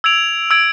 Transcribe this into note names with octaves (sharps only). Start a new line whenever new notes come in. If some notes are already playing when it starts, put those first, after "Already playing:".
E6 G#6 D7 F7
E6 G#6 D7 F7